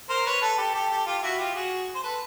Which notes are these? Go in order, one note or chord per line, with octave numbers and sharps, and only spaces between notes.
A#4 C5
B4 C#5
A4 B4
G4 A4
G4 A4
G4 A4
F4 G4
F4
E4 F#4
F4 G4
F#4 G#4
C5
A4 B4